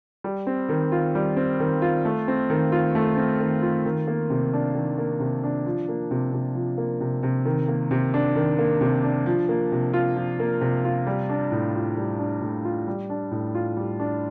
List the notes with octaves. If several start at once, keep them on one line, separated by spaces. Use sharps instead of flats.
G3
C4
D#3
F4
G3
C4
D#3
F4
A3
C4
D#3
F4
A3
C4
D#3
F4
D#3
A#3
C3
D4
D#3
A#3
C3
D4
F3
A#3
C3
C3
F3
A#3
C3
C3
D#3
A#3
C3
D4
D#3
A#3
C3
D4
F3
A#3
C3
F4
F3
A#3
C3
F4
G3
D4
A2
F4
G3
D4
A2
F4
G3
D4
A2
F4
G3
D4